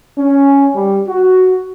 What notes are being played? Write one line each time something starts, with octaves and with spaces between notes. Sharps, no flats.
C#4
G3
F#4